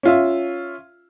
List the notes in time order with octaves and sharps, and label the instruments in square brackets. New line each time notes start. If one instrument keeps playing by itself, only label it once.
[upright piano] C#4 F4 E5